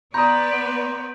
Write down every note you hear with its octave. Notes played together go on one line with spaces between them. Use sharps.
B3 B4 D5 A#5 C6 D#6 G6